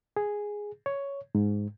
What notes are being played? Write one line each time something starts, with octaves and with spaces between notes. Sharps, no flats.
G#4
C#5
G#2